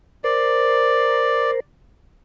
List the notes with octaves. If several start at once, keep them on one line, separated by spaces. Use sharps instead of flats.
A#4 C5 D5